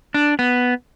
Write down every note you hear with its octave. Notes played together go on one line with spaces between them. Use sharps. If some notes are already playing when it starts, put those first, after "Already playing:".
D4
B3